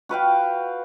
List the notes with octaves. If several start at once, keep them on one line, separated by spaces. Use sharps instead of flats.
F#4 B4 F5 G5